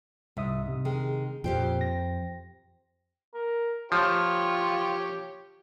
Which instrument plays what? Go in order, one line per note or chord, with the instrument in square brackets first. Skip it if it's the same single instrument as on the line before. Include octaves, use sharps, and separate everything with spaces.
[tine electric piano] C2 E5 D#6 [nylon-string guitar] G#2
[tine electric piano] C3
[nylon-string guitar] D#3 G#3
[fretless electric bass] F2 [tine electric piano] A#2 [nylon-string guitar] G4 C5 G5
[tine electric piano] A#6
[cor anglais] A#4
[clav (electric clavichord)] F3 [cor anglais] F4 [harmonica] G4 C#5 G5